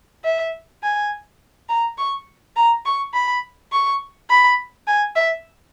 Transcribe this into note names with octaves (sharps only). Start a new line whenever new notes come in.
E5
G#5
A#5
C#6
A#5
C#6
B5
C#6
B5
G#5
E5